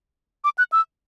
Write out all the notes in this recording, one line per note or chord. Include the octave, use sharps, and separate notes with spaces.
D6
F#6
E6